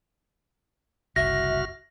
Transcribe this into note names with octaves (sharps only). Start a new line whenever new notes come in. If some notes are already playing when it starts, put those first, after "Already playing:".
F#1 C2 F#4 E5 F6 A#6